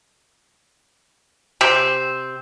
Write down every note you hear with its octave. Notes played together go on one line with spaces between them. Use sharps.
C3 C4